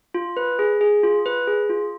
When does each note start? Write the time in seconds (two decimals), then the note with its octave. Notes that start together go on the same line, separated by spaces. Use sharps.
0.14 F4
0.37 B4
0.59 G#4
0.81 G#4
1.03 F4
1.26 B4
1.47 G#4
1.70 F4